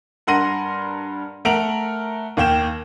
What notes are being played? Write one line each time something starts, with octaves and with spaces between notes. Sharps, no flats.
G2 A#4 F#5 C6 A#6 D#7
A3 A#4 F#5 D7 F7 F#7
D#2 A#3 G5 E7